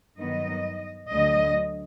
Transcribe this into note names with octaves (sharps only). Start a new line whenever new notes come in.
G2 D#3 F#3 B3 D#4 D#5
D2 D3 F#3 D#5